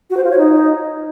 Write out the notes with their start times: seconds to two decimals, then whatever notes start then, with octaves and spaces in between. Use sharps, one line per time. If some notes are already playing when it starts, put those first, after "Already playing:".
0.10 F#4
0.17 C5
0.24 F4
0.31 C#5
0.38 D#4